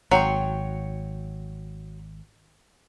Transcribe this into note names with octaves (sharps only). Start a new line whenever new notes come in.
G#1 F#3 C#5 G5 C6